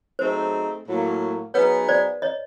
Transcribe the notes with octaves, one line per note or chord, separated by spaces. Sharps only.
F#3 A3 C4 D#4 G#4 C5
A2 F#3 A#3
F#3 B3 D#4 G#4 B4 C#5
C5 D5
C#5 D#5